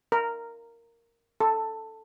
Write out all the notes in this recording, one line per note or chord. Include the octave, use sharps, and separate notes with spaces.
A#4
A4